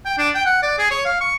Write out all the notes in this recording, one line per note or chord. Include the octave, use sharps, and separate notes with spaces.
G5
D4
G5
F#5
D5
G#4
C#5
F5
C#6